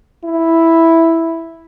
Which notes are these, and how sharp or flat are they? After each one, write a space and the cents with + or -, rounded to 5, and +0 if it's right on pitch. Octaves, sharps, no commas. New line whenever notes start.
E4 +0